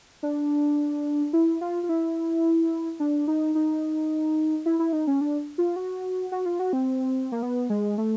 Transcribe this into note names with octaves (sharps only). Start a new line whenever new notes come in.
D4
E4
F4
F4
E4
D4
D#4
D#4
E4
E4
D#4
C#4
D4
F4
F#4
F#4
F4
F#4
C4
A#3
B3
G#3
A3